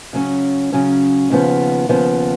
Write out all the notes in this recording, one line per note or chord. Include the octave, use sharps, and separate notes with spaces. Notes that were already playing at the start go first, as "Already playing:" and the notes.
C#3 F#3 C#4
C#3 F#3 C#4
D#2 C#3 F3 B3
D#2 C#3 F3 B3